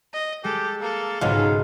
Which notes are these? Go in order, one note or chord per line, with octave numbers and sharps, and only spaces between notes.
D#5
G#3 G4 A4
A#3 A4
B1 G#2 C#3 F#3 G#3 F4 F5